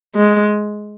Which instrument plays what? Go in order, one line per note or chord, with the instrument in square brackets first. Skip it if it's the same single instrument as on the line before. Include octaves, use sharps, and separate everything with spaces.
[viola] G#3